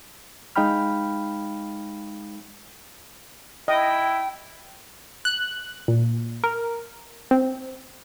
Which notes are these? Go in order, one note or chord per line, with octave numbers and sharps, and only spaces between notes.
G#3 D#4 F5 G5 B5 F6
E4 D#5 G5
F#6
A#2
A#4
C4